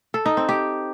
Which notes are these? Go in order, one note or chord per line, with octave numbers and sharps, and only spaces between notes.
A4
D#4
C4
G4